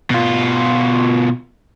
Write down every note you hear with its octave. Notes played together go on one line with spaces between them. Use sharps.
B2 F4